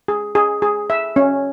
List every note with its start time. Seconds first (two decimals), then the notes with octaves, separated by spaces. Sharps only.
0.08 G#4
0.35 G#4
0.62 G#4
0.90 E5
1.16 C#4